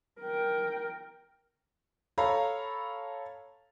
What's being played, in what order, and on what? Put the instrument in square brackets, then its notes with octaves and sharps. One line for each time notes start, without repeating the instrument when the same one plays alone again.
[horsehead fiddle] A#4 G5
[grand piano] A4 C#5 F5 A#5 B5